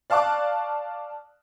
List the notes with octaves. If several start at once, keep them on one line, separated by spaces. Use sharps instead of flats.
D5 F5 A5 C#6 D6 F#6